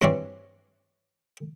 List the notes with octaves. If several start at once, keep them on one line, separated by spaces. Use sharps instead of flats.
G2 B2 E3 C4 C#5 D5